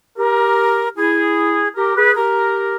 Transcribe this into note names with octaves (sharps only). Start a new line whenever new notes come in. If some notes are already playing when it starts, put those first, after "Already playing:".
G4 A#4
E4 G#4
G4 A#4
G#4 B4
G4 A#4